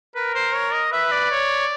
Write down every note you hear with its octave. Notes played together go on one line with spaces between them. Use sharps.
A#4 B4
C5
C#5
D#5
B4 E5
D5
C#5